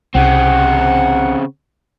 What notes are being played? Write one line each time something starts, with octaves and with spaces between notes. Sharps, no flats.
C2 C#3 C4 F#5